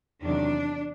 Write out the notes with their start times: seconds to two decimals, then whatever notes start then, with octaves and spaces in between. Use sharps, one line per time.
0.22 E2 C3 D#3 F#3 D4